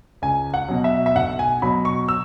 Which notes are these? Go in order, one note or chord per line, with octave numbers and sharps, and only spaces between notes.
C#2 G#5
F#5
B2 F#3
E5
E5
B1 F#5
G#5
B2 F#3 B5
C#6
E6